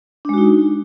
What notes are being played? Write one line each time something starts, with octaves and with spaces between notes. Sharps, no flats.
G#3 D4 D#4 F#4